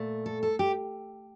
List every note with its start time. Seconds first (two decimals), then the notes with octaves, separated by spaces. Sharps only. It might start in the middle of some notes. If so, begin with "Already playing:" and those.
Already playing: A#2 A3
0.26 A4
0.43 A4
0.59 G4